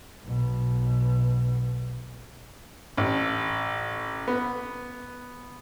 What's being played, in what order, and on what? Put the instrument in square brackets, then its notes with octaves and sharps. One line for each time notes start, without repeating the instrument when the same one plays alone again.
[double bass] B1 B2
[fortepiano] A1
B3